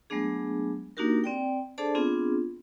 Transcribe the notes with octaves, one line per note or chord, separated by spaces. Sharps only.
F#3 G#3 A3 B3 D4 G#4
A#3 D4 D#4 F#4 G4 A#4
C4 D5 G5
D4 G#4 A4 C5 D5 A5
B3 C4 D4 F4 G#4